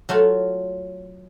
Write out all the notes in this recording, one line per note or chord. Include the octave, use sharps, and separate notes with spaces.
F#3 A3 F4 F#4